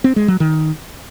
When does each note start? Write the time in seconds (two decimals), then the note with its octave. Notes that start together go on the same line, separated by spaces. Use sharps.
0.04 C4
0.16 G#3
0.28 F#3
0.40 D#3